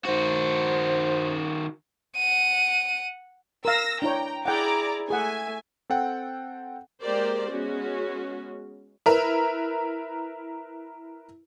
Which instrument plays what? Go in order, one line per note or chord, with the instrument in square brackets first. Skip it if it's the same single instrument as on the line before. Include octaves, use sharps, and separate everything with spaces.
[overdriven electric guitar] D#3 F#4 [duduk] C5
[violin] F#5 D#7
[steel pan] A#4 F5 [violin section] E6 A#6
[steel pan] D4 E4 C#5 [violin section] G5 A#5
[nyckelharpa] E4 G#4 [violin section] D5 A#5 D6 [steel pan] F#5 G5
[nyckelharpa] A3 E5 [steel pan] G#4 F#5 [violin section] G#5
[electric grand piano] C4 A4 F#5 G5
[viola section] G#3 A#3 G4 A#4 C5 D5
G#3 B3 C#4 F#4
[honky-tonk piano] E4 A#4 B4